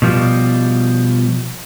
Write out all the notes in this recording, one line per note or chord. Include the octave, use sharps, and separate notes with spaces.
B2 F3 G3